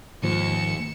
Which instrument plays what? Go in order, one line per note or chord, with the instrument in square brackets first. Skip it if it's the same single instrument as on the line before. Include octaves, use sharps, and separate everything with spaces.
[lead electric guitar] D#2 [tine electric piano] G#2 F3 [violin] C#7 E7